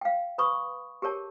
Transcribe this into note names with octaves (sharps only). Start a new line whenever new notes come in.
F5 G5
B4 B5 C#6 D#6
G4 G#4 A#4 C#5 A5